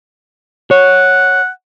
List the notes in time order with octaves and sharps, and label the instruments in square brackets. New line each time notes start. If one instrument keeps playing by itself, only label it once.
[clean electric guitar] C#5 [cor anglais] F#5